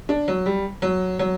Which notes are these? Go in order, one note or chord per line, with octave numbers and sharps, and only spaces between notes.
D4
F#3
G3
F#3
F#3